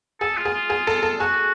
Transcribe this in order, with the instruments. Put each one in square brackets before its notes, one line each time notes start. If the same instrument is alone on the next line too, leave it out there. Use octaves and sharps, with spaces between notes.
[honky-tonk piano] G#4 [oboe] A4
[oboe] F4
[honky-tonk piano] G#4
[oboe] F4
[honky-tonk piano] G#4
A4
A4
[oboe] F#4 [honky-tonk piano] G#4